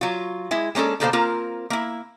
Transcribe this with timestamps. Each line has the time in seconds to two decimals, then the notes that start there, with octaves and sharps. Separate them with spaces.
0.01 F#3 F4
0.51 G#3 E4
0.75 G#3 A#3 C#4 D4 A4
1.00 B2 D3 A#3 A4 C5 F5
1.13 A#3 C4 F4 A#4
1.70 A#3 E4